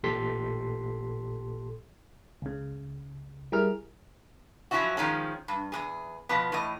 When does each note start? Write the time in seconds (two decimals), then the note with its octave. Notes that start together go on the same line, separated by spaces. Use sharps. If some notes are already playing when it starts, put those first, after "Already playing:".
0.03 A1 A#2 G4 A4 C6 B6
2.42 C#2 C#3
3.52 G3 E4 G#4 A#4 F6
4.71 F3 F#3 A#3 C#4 E4 F#4
4.97 D#3 F3 G#3 C#4
5.48 G2
5.72 E2 G2 G#4
6.29 B2 F3 B3
6.52 A2 E3 D#5